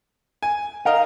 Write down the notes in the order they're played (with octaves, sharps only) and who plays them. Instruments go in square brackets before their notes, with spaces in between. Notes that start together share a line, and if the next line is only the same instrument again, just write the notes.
[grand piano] G#5
[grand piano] D#4 A#4 D#5 [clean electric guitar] F5